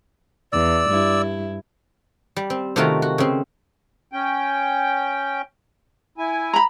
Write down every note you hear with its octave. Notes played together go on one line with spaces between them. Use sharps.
E2 D5 E6
G2 E4
G3
C4
C3 D#3 A3 F4 F#4 A#4
F#4
C#3 C4
C#4 G5
E4 G#5
A#5 B5